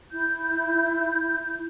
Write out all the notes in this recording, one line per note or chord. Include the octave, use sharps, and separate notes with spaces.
E4 G6